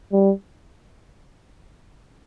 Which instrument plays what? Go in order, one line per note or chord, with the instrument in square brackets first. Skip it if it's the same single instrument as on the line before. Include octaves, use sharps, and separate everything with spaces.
[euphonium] G3